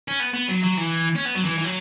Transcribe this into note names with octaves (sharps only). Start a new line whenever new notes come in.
C#4
B3
B3
F#3
F#3
E3
C#4
B3
F#3
E3
E3
F#3